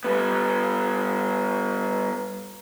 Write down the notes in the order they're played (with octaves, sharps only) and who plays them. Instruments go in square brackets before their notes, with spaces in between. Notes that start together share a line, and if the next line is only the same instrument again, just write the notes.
[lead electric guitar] G3 B3